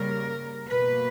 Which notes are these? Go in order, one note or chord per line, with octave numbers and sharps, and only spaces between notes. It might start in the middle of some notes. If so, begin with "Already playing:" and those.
Already playing: C#3 G3 A#3 A#4
B2 A#3 B4